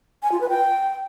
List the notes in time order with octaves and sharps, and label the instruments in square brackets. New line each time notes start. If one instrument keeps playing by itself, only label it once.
[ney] G#5
F4
B4
G5